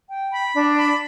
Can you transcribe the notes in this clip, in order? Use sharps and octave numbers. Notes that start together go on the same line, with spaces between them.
G5
B5
D4
B5